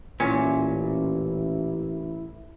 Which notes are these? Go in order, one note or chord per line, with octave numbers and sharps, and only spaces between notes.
A1 A#2 C#4 E4